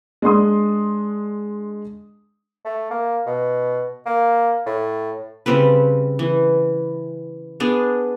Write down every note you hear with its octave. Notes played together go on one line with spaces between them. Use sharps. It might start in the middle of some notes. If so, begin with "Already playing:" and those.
G#3 D4 C6 D#6
A3
A#3
B2
A#3
A2
C#3 G3 C4 B4
E3
B3 D4 G#4